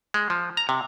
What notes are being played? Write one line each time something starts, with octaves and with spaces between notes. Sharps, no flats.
G#3
F3
A#5
C3